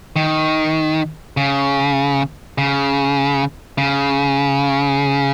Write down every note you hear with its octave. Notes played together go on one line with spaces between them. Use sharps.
D#3
C#3
C#3
C#3